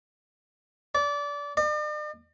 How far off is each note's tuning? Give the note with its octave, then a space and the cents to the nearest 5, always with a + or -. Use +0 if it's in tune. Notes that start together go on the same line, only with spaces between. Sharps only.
D5 -25
D5 +45